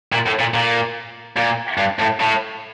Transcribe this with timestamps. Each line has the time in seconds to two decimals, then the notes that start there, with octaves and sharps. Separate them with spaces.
0.12 A#2
0.26 A2
0.39 A#2
0.54 A#2
1.36 A#2
1.78 G2
1.99 A2
2.20 A2